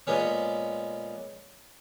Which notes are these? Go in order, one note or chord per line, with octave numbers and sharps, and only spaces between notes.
A#2 G#3 B3 C#4